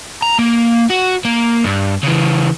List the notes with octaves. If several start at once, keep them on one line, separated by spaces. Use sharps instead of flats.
A#5
A#3
F#4
A#3
G2
C#3 E3